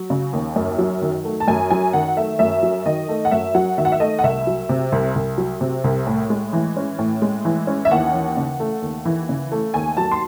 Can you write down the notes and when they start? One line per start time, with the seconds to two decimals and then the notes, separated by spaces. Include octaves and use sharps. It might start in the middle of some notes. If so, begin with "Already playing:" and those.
Already playing: F#3
0.10 C#3
0.33 D#2
0.56 F#2
0.78 F#3
1.02 D#3
1.25 A3
1.40 A5
1.48 F#2 G#5
1.70 F#3 G#5
1.93 D#3 F#5
2.17 A3 E5
2.39 F#2 E5
2.63 F#3
2.86 D#3 D#5
3.08 A3
3.25 F#5
3.31 F#2 E5
3.55 F#3 F#5
3.78 D#3 E5
3.85 F#5
3.92 E5
4.00 A3 D#5
4.19 F#5
4.23 C2 E5
4.47 F#3
4.69 C3
4.92 C2
5.16 C2
5.38 F#3
5.61 C3
5.84 C2
6.07 A2
6.30 G#3
6.53 E3
6.77 C#4
6.98 A2
7.22 G#3
7.45 E3
7.67 C#4
7.85 E5
7.91 D#2 F#5
8.14 E3
8.37 C#3
8.60 A3
8.82 D#2
9.05 E3
9.29 C#3
9.52 A3
9.74 D#2 G#5
9.97 F#3 A5
10.12 C6